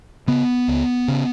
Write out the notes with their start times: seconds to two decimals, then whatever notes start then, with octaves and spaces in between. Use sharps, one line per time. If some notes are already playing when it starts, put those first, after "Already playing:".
0.27 C#3 B3
0.68 C#2
1.08 C#3